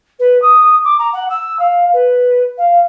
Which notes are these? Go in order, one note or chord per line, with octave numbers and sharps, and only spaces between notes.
B4
D#6
D6
A#5
F#5
E6
F5
B4
F5